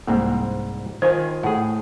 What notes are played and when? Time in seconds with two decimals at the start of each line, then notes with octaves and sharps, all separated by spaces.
0.07 C2 G#2 A#3 C4
1.02 D#3 F4 C5 G#5
1.43 A2 G#4 F#5